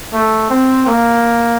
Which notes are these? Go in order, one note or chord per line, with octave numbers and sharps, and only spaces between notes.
A3
C4
A#3